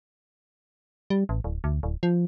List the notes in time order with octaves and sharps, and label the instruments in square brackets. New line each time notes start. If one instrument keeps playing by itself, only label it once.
[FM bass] G3
A1
D1
D2
D1
F3